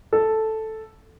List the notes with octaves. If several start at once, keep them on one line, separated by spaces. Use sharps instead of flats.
A4